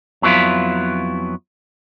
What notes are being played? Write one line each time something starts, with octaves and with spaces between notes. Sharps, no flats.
F2 F#3 B3 E4 F4